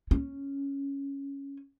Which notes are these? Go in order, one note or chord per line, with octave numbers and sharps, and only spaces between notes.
C#4